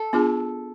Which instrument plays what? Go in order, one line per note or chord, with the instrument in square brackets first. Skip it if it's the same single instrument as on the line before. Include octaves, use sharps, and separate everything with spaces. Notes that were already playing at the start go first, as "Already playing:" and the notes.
Already playing: [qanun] A4
[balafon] B3 D4 F4 G#4